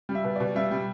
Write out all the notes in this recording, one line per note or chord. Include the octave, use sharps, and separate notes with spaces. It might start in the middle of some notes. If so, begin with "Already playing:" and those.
G3
E5
B2
B2 D5
G3 E5
G3